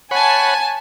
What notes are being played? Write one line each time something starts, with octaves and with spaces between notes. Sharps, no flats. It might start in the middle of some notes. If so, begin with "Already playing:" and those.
C#5 F#5 G#5 A5 B5